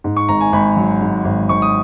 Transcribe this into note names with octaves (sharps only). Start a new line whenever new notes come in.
G#2
C#6
G#1 A#5
G#5
G#1 B5
F#3
G#2
G#1
G#1 C#6
D#6